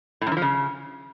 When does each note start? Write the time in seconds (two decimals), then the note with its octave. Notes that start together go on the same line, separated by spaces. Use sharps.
0.21 A2
0.27 F#2
0.32 E3
0.37 F3
0.42 C#3